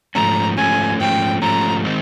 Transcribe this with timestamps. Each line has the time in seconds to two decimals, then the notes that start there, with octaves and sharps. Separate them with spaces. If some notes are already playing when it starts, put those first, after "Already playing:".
0.15 G#2 F3 A3 C#4 A#5
0.57 G#2 F3 A3 C#4 G#5
0.99 G#2 F3 A3 C#4 G5
1.42 G#2 F3 A3 C#4 A#5
1.85 D#3 G#3 C4 D#4